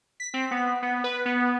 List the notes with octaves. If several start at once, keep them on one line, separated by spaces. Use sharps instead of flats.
B6
C4
B3
B3
B4
B3